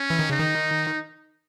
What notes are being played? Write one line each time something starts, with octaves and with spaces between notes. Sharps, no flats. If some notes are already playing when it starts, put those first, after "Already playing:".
Already playing: C#4
E3
D#3
C#3 D#4
D#3